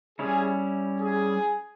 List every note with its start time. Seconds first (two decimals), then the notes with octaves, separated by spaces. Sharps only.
0.19 G3 C#4 E4 G#4
1.00 G#4